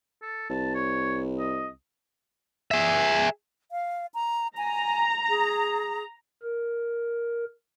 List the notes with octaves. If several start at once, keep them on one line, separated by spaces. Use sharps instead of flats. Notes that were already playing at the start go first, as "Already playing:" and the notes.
A4
C2 A5
C#5
D#5
G#4 E5
F5
A#5
G#5 A#5
G#4
A#4